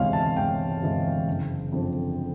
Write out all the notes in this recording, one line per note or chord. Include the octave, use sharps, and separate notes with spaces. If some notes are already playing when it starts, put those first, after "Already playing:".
Already playing: E1 D2 C3 E3 G#3 C#5 F5
A5
E1 G5
D2 C3 E3 G#3
F#1
F2 D3 F3